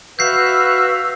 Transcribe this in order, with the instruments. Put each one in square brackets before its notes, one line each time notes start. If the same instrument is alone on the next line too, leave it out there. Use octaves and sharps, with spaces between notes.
[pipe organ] F#4 E5 F5 [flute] B4 [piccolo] E6 [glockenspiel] G6 C7